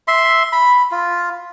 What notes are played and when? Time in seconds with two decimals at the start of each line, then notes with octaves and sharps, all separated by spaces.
0.08 E5 C6
0.53 B5
0.91 F4